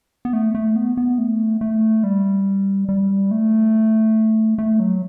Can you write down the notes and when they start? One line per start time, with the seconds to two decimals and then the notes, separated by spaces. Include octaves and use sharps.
0.25 B3
0.33 A3
0.55 A3
0.76 B3
0.97 B3
1.18 A3
1.61 A3
2.04 G3
2.89 G3
3.31 A3
4.58 A3
4.80 F#3